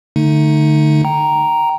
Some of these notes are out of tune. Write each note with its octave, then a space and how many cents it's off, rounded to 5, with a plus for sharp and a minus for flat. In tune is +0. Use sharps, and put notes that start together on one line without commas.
D3 +10 A3 +0 D#4 +0
G5 -15 A#5 +0